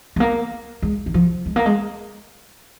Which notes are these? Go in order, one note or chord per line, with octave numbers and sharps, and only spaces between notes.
G#3
A#3
G#3
D#3
F3
G#3
A#3
G#3